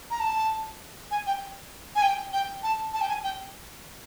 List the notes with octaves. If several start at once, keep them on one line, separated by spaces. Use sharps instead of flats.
A#5
A5
G#5
G5
G#5
G5
G5
A5
A5
G5
G#5
G5